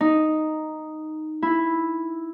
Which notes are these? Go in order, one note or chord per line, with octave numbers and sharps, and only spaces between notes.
D#4
E4